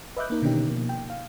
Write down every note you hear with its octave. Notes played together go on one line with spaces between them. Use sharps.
B4 D#5 E5 D6 F#6 G6
A#3 D#4 A#4
B2 D3 D#3 C#4 D#4 G4
B2 F3 A#3
G5
F5